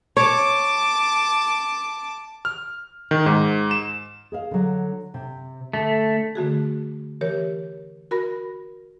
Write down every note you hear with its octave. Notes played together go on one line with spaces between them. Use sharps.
C#5 A5 D6
F6
D#3
G#2
E7
G#4 D#5 F5
D3 F#3
C3
D3 A3
D3 A3 F#4 G#4
E3 G4 A#4 C#5
F#4 A#4 B5 A#6